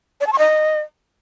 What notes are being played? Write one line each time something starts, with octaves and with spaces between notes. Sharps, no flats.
D5
A5
C#6
D#5